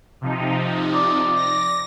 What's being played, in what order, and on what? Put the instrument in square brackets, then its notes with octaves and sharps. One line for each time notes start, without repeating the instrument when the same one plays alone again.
[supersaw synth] C3 F3 D#4
[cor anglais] D5
[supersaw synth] A#6